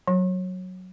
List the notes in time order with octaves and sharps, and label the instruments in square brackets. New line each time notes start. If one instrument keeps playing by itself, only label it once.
[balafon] F#3